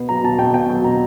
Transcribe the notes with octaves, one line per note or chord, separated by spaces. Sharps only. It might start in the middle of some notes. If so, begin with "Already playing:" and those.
Already playing: B2 B3
F#3 A#5
B2 A5
B2 G5
B3 G5
F#3
B2 A#5